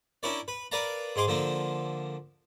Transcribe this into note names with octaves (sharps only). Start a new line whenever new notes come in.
C#4 D4 E4 A#4 C#5 D5
B4
A#4 B4 D5 F5 A5 A#5
G#2 G#3 G#4 C6 D6
D3 F3 A#3 D4